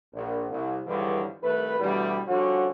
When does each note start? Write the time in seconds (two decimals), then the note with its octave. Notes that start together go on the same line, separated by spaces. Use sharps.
0.14 A#1
0.50 C2
0.86 C#2 G2 D3 E3 F3 G3
1.43 C2 D#3 A3 B4
1.80 D2 B2 E3 G3
2.27 D3 F3 G3 C#4 F#4